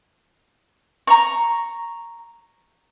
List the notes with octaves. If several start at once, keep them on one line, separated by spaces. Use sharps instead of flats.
A#5 C#6